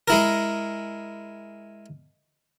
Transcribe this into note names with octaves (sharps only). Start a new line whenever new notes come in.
G#3 E4 A#4